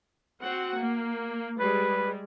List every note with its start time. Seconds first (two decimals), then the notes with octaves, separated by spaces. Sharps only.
0.42 C4 F#4 F#5
0.77 A#3
1.59 G3 G#3 B4